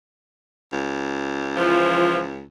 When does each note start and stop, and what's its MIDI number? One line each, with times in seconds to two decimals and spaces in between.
0.73 2.43 37
1.57 2.21 52
1.57 2.21 53